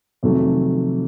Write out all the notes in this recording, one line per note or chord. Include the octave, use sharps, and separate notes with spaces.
F1 F2 D#3 F#3 A3